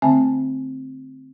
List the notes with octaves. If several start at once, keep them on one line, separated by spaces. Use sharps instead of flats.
D3 A3 C4 E5 G#5 A5